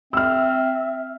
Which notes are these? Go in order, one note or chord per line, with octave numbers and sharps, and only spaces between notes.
C4 E5 E6 F6